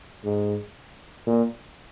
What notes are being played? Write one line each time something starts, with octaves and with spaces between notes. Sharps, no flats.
G#2
A#2